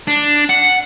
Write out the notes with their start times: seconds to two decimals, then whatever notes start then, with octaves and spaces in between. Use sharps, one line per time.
0.08 D4
0.49 F#5